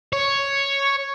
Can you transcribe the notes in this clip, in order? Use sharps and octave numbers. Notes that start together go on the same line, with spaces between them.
C#5